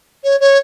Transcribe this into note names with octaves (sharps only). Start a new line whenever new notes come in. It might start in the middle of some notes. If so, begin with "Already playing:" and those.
C#5
C#5